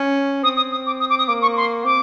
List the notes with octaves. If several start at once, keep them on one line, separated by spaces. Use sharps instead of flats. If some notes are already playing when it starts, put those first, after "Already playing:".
Already playing: C#4
C4 D#6
D#6
D#6
D6
D#6
D6
D#6
A#3 D6
C#6
C6
C4 D6